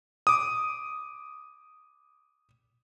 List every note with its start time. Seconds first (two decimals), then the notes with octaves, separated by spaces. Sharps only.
0.27 D6 D#6